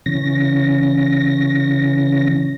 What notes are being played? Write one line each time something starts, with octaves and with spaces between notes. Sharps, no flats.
C#3 E3 C#4 A#6